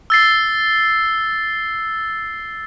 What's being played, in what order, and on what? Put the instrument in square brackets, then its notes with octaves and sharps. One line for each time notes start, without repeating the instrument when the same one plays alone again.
[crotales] E6 A6 C7